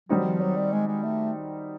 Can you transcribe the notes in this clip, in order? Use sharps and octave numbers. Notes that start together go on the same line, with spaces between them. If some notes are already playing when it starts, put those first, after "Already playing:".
D#3 F#3 G3 C4 D#4 F#4
F3
F#3
G3
G#3
G#3
A3